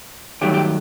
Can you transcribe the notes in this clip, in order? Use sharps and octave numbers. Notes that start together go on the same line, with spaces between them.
G2 D#3 F#3 A3 G4
G4